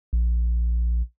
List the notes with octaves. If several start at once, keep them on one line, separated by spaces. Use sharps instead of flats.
A#1